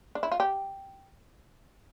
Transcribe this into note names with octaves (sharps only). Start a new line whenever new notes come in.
D4
E4
F4
G4